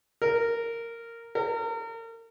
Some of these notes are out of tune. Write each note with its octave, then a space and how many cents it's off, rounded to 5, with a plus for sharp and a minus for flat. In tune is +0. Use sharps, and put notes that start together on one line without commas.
A#4 -10
A#4 -35